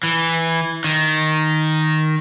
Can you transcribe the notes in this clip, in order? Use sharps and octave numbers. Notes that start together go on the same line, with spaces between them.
E3
D#3